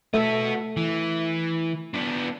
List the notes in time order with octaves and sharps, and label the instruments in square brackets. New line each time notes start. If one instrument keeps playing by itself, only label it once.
[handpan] A3 A4 E5 [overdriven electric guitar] B3 F#4
[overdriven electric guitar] E3
B3 D4